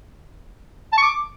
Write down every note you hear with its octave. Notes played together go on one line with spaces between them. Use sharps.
A5
C#6
D6